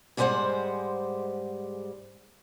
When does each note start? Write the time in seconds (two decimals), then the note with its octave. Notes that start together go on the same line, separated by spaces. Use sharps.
0.17 G#2 G3 G#3 D4 C5 F#5